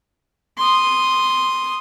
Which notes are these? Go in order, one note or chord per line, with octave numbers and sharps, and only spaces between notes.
C6 D#6